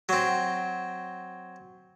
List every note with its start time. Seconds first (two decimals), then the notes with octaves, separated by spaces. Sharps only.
0.09 F#3 C4